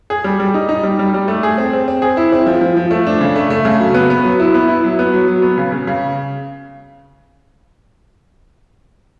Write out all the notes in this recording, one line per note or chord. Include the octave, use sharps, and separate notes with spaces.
G#4
G3
G3
D#4
D#4
G3
G3
G3
A3
G#4
C4
C4
C4
G#4
E4
C4
F3
F3
F3
A3
D4
C#3
A3
A3
C#3
F#3
B3
B3
F#3
E4
B3
E4
F#3
B3
F#3
F#3
B3
C#3
C#3
C#3